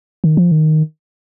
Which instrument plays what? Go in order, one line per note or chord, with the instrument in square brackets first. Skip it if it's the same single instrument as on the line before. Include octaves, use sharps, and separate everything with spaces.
[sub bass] D#3
F3
D#3